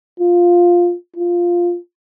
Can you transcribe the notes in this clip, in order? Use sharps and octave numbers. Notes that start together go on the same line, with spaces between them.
F4
F4